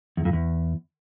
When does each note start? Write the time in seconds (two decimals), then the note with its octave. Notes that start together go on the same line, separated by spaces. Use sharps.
0.17 E2
0.25 F2
0.33 E2